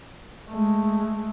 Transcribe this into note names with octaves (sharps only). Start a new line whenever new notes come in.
G#3 A3